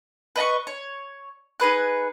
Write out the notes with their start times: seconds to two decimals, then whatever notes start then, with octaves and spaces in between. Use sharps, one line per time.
0.36 B4 D#5 A#5 C#6
0.67 C#5
1.60 D#4 G#4 B4 F#6